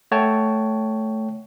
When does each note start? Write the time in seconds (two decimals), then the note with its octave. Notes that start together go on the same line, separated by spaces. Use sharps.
0.12 A3 C#5 F#5 G5 A5